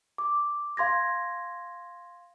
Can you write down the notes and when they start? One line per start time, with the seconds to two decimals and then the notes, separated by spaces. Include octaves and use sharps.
0.18 D6
0.77 F5 C6 G#6 A#6